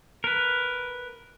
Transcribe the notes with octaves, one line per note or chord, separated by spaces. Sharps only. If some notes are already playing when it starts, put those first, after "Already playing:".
A#4 B4